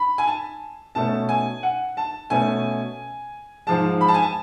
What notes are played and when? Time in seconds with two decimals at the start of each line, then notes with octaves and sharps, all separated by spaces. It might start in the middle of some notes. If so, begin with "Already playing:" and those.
Already playing: B5
0.18 G#5
0.27 A5
0.95 B2 A3 C#4 A5
1.29 G#5
1.63 F#5
1.97 A5
2.30 B2 A3 C#4 G#5
3.67 G#2 F3 G#3 A5
4.01 B5
4.08 A5
4.14 G#5
4.22 A5